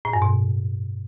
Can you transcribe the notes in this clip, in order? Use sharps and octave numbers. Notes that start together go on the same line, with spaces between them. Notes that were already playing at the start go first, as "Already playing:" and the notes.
A2
G2
B2